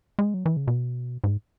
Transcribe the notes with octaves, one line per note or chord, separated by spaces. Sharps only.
G#3
F#3
E3
C#3
B2
G#2